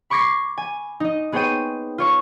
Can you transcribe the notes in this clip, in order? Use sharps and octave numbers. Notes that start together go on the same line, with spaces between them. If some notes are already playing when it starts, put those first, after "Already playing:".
B5 C#6 D6 G#6 A#6 C7
G#5
D#4 D#5
B3 G#4 C5 C#5 G5 D#7
F4 C#5 C#6